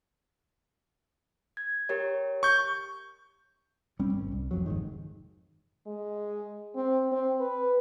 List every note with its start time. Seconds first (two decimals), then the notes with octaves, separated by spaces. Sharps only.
1.57 G#6
1.89 G4 A#4 C#5
2.43 C#6 G6
3.99 E1 G3 C4 C#4
4.14 G#1
4.32 C2
4.51 F#1 F2 F#3
4.66 F1 G#2 D#3
5.86 G#3
6.76 C4
7.12 C4
7.40 B4